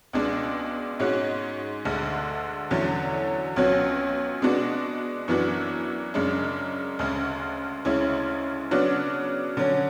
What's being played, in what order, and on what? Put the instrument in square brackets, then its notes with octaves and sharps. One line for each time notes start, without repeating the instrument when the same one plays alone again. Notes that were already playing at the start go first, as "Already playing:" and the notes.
[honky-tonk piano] C#2 B2 G#3 D4
G#2 G#3 C#4 F#4
D2 D3 G#3
E2 D3 F#3 A3 C#4
C#2 B2 F#3 C#4 F#4
B2 G#3 B3 D4 F#4
F#2 E3 B3 D4 F#4
F#2 C#3 G#3 D4
D2 C#3 G#3
D2 C#3 G#3 C#4 E4
C#3 F#3 B3 D4 F#4
D3 F#3 C#4